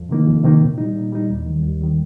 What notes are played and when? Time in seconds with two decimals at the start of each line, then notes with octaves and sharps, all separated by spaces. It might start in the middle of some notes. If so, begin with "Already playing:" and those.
Already playing: F2
0.09 C3 D#3 A#3 D#4
0.27 F2
0.43 C3 D#3 A#3 D#4
0.61 A#2
0.78 G3 D#4
0.94 A#2
1.13 G3 D#4
1.30 D#2
1.46 D#3 G3
1.63 D#2
1.81 D#3 G3